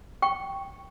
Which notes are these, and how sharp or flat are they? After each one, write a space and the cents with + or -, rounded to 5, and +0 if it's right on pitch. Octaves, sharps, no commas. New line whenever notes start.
G5 +0 C#6 +0